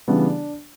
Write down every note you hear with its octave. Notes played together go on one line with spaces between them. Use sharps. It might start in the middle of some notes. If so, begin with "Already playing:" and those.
C#3 E3 G3 B3 D4